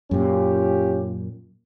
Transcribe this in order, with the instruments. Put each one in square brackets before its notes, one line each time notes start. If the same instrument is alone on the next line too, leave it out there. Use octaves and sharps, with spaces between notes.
[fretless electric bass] F#2 A#2 [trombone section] C#4 F4 G4